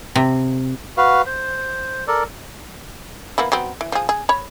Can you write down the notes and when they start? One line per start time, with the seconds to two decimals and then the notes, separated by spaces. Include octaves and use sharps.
0.16 C3
0.97 F#4 B4 F5
1.26 C5
2.08 A4 A#4 D5
3.38 A#3 B3 E4
3.52 F#3 B3 C4
3.81 E3
3.92 F3 G#4
4.09 G#4
4.29 C#5 B5